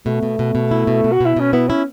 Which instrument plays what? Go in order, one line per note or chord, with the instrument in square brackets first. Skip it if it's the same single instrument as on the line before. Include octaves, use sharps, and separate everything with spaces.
[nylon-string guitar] B2 [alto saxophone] A3
[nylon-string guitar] B2
B2
B2
E4
B2
B2
[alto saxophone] F#4
[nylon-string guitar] B2 [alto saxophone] E4
[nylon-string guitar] B2 [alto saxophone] C#4
[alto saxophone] B3 [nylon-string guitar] E4
[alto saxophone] C#4 [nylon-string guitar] E4